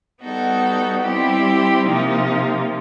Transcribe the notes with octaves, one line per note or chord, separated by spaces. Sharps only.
G3 B3 D#4 F#4 A4
G3 C4 E4 G4
C3 F3 A#3 D#4